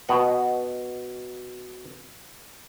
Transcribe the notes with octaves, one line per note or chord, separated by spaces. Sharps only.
B2 D#5 F#5